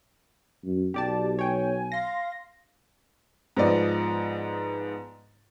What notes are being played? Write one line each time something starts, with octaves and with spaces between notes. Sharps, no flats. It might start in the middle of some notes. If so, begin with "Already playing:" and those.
F#2
B1 G4 D5 A5
C#5 G5 G#5
F5 C6 A#6
G#2 F3 B3 D5 D#5